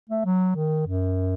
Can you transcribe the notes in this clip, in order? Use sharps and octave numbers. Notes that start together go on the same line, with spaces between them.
A3
F#3
D#3
F#2